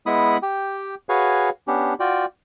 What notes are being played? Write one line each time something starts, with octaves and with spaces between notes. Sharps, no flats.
G#3 B3 E4 B5 D#6
G4 G5
F#4 G#4 B4 C#5 F5 G#5
B3 C#4 D4 G4
F4 F#4 D5 G5